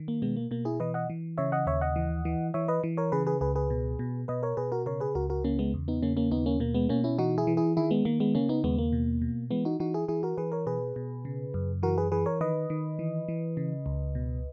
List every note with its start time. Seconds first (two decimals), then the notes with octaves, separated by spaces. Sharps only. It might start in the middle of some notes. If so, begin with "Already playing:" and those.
Already playing: D#3
0.08 A#3
0.22 B2 G#3 B3
0.36 A#3
0.51 B2 A#3
0.65 E4 G#4
0.80 E3 B4 D#5
0.94 D#5 F#5
1.10 E3
1.38 C#3 C#5 E5
1.52 D#5 F#5
1.66 D#2 C#5 E5
1.81 D#5 F#5
1.96 E3
2.25 E3
2.54 E3 C#5 E5
2.68 B4 D#5
2.84 E3
2.97 A#4 C#5
3.12 C#3 G#4 B4
3.27 G#4 B4
3.41 C#2 G#4 B4
3.56 G#4 B4
3.70 B2
3.99 B2
4.28 B2 B4 D#5
4.43 A#4 C#5
4.57 B2 G#4 B4
4.72 F#4 A#4
4.86 C#3 A#4 C#5
5.00 G#4 B4
5.15 C#2 F#4 A#4
5.30 F#4 A#4
5.44 C#3 A#3 C#4
5.59 G#3 B3
5.74 E2
5.88 B3 D#4
6.02 C#3 A#3 C#4
6.17 A#3 C#4
6.31 D#2 B3 D#4
6.46 A#3 C#4
6.60 B2 A#3
6.74 G#3 B3
6.89 B2 A#3 C#4
7.04 C#4 E4
7.18 E3 D#4 F#4
7.38 E4 G#4
7.47 E3
7.57 E4 G#4
7.77 D#3 E4 G#4
7.91 G#3 B3
8.05 D#3 A#3
8.20 G#3 B3
8.35 C#3 A#3 C#4
8.49 B3 D#4
8.64 D#2 G#3 B3
8.78 A#3
8.93 B2
9.22 B2
9.51 E3 G#3 B3
9.65 D#4 F#4
9.80 E3 D#4 F#4
9.94 E4 G#4
10.08 E3 E4 G#4
10.23 F#4 A#4
10.37 E3 G#4 B4
10.52 A#4 C#5
10.66 B2 G#4 B4
10.96 B2
11.25 C#3
11.54 F#2
11.83 E3 F#4 A#4
11.98 G#4 B4
12.12 E3 G#4 B4
12.26 A#4 C#5
12.41 D#3 B4 D#5
12.70 D#3
12.99 E3
13.28 E3
13.57 C#3
13.86 C#2
14.15 B2